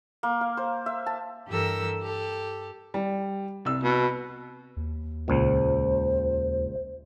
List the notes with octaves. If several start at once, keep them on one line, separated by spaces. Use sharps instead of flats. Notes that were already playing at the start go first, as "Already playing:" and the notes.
A#3
F5
C5
E5
A5
G2 E3 G4 A4 A#4 E6
G4 A4
G3
C2 E6
B2
D#2
C#2 A#2 C5